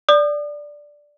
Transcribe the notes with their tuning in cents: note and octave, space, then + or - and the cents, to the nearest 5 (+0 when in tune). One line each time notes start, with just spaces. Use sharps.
D5 +0 D#6 -45